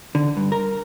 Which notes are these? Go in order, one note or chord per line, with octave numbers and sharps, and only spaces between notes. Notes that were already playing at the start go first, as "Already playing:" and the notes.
D3
G2
A#4